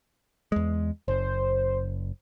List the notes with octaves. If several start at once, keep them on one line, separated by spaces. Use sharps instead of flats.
E2 G#3
F#1 C5